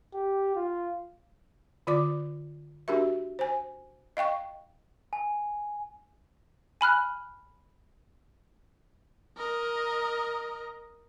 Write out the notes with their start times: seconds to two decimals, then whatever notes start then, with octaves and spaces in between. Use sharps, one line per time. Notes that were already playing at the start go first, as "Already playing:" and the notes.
0.14 G4
0.55 F4
1.87 D3 F4 D5 D6
2.88 D4 F#4 G4 A#4 E5
3.39 C5 G#5
4.17 D#5 F5 G5 C#6
5.13 G#5
6.81 G#5 B5 F6 F#6
9.37 A#4 D#5